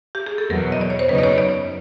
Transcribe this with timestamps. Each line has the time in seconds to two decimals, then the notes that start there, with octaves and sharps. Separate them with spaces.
0.15 G4
0.26 G#4
0.38 A4
0.50 E2 B2 F#3 A#4
0.72 D#5
0.81 D5
0.90 C#5
0.99 C5
1.09 F#2 C#3 F#3 B3 D#4 B4
1.18 D5
1.23 C#5
1.38 D5